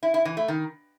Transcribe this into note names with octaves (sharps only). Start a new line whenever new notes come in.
E4
E4
E3
A3
D#3